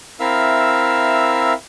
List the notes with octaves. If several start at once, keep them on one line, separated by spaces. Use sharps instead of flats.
C4 E4 A#4 E5 F5 E6